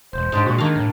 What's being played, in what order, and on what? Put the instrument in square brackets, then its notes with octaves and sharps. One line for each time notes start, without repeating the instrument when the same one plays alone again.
[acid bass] E1 [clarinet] C5
[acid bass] G#2 [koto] G#3 D4 G4
[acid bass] A#2 [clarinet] F#4
[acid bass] D#3 [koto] A#3 F5 [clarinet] D4
[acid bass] A2